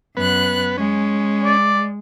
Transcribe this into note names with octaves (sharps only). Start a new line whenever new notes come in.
F#2 B3 B4 F#6
G#3 C#4
D5